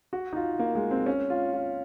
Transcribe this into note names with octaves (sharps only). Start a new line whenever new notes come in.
F#4
D#4
F4
A#3
G#3
C4
C#4
F4
F4